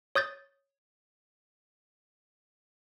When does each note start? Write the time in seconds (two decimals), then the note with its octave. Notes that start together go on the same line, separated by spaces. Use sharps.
0.15 C#5 D#6 G6 A6